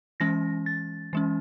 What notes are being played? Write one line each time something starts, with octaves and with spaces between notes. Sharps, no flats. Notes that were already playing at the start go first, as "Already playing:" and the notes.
E3 G#3 C#4 A#6
A6
E3 G#3 C#4